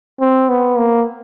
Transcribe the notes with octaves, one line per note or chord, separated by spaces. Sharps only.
C4
B3
A#3